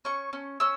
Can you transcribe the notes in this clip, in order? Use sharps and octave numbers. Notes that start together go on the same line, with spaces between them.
C#4 C#6
C#4
C#4 E6